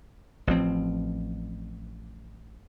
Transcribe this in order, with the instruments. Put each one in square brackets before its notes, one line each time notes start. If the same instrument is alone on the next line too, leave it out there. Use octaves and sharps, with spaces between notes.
[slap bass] A1 F3 C4